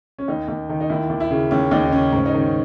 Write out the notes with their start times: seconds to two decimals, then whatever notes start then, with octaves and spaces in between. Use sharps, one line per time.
0.18 C#4
0.28 D#2 D#4
0.48 D#2
0.69 D#3
0.80 D#4
0.89 D#2 E4
1.09 D#2
1.20 E4
1.31 C#3
1.51 D#2 C#4
1.71 D#2 D#4
1.85 D#4
1.92 C#3 C#4
2.12 G#2 C#4
2.26 D#4
2.34 D#3
2.39 C#4